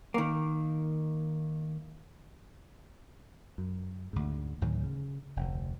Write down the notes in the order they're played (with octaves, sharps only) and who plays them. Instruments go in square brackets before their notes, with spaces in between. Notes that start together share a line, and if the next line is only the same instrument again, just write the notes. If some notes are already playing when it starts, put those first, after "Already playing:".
[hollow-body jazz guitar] D#3 A#3
[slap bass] F#2
D2 G#2
D2 A2 D#3 F#3
C#3
F1 D2